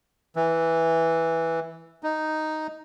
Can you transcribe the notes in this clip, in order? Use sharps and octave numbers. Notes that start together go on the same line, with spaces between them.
E3
D#4